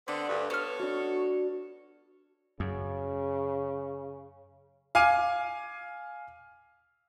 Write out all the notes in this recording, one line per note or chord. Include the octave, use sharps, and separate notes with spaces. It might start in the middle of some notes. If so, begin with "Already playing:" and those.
D3 B3 C4 D5
D2 G2
B3 A4 C#5 F6
D4 F#4
F#2 C#3
F5 G#5 D6 F6 D#7